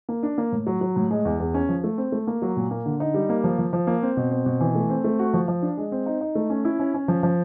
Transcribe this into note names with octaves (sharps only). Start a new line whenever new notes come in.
A#3
D4
A#3
A2
F#3
F#3
A2
G#3
E2
E2
C#4
F3
A3
C4
A3
A#3
F#3
A#2
A#3
D3
D#4
G3
A#3
F3
F3
F3
A#3
C4
B2
C4
B2
E3
A3
C4
A3
F#4
F3
F3
D4
G#3
C4
D#4
D#4
A3
C#4
E4
C#4
C#4
F3
F3